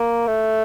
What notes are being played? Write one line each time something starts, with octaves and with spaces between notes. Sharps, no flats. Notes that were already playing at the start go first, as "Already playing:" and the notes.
Already playing: A#3
A3